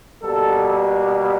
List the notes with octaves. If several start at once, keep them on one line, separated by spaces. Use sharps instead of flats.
B2 G3 A#3 A4
B4